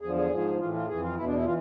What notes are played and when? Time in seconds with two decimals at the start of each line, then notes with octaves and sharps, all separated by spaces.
0.01 E2 D3 F3 G#4
0.16 G#4
0.30 G#2 F3
0.59 A2 E3 F4
0.74 F4
0.87 F2 E3 G#4
1.02 F4
1.17 E2 B2 E4
1.26 D4
1.36 E4
1.45 E3 F4